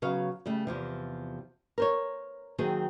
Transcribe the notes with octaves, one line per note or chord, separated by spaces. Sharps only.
C#3 F#3 B3 F5
C#3 G3 A3
E2 C3 F3
A#4 C5 C#5
D#3 F#3 A#3 C4 G#4